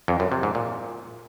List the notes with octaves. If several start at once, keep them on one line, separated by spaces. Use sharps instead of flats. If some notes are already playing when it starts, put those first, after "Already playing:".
F2
F#2
C3
G#2
A#2